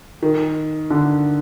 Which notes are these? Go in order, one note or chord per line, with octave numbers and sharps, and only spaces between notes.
D#3
D3